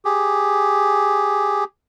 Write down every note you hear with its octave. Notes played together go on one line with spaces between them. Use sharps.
G4 G#4